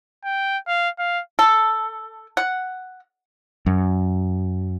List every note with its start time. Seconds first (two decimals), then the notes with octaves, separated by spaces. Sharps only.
0.25 G5
0.67 F5
0.99 F5
1.39 A4
2.37 F#5
3.66 F#2